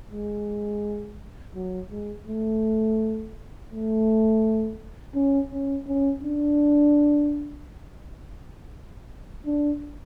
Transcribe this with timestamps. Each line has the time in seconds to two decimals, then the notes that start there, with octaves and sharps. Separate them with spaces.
0.11 G#3
1.55 F#3
1.90 G#3
2.27 A3
3.71 A3
5.15 C#4
5.51 C#4
5.87 C#4
6.23 D4
9.46 D4